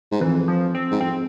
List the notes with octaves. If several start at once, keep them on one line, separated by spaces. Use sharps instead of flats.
G#2
F2 E3
F3
C4
G#2
F2 C4